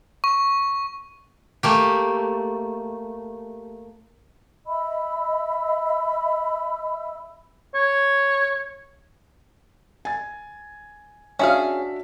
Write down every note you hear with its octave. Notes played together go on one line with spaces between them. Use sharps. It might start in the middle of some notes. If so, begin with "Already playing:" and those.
C#6
A3 A#3 G4
D#5 E5 B5 E6
C#5
G#5 A6
C#4 D4 F#4 G#4 E5 F5